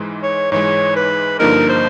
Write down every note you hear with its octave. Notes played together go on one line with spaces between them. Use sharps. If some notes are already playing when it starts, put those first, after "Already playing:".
Already playing: G#2 E3 G#3
C#5
G#2 E3 G#3 C#5
B4
G2 D3 F3 A#3 D#4 A#4
C5